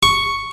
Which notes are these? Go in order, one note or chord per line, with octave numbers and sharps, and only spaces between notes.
C#6